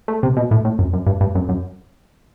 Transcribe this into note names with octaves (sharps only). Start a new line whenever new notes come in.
A3
C3
B2
A2
A2
F#2
F#2
G2
G2
F#2
F#2